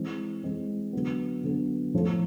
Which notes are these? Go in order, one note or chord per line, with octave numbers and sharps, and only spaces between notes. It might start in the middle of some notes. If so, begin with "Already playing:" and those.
Already playing: E3 G#3 C4
E3 G#3 C4
D3 F#3 B3
D3 F#3 B3
A2 F3 A3